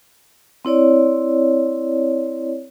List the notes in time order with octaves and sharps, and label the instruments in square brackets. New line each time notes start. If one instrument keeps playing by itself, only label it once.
[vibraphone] C4 E4 C#5 D5